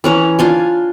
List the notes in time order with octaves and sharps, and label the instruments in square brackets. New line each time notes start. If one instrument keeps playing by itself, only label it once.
[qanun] E3 C#4 A#5
D4 F4 G#5